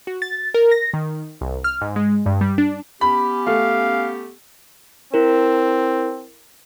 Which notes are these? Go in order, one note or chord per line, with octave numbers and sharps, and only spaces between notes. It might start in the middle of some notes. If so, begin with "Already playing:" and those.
F#4
A6
A#4
A#6
D#3
C2
F6
G#2
G#3
G2
G3
D4
B3 C#4 G4 B5
A3 F5
C4 E4 A#4